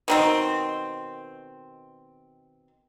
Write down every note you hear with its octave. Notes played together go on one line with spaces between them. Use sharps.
B2 D#3 C4